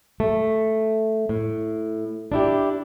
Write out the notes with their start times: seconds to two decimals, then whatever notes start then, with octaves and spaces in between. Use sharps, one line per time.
0.20 A3
1.29 A2
2.32 D4 E4 G4